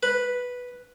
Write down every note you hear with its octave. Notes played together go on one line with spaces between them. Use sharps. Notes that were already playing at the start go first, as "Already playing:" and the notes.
B4